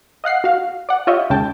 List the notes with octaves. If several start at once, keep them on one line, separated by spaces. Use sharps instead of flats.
D#5 F5 F#5 C7
F#4 F5
D5 F#5
F4 G4 C#5 D#5 E5
D#2 C#3 G#3 G5 A5